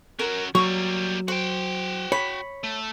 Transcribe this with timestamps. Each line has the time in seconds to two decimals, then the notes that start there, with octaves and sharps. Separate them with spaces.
0.19 C#4 F#4 A#4
0.55 F#3 G3 A#3 C#6
1.28 F#4 C5 G5
2.12 C#5 B5
2.63 A3